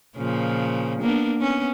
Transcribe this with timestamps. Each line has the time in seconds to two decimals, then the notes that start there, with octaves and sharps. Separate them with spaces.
0.16 A#2 C#3 F3
1.01 A#3 B3 D4
1.38 B3 C#4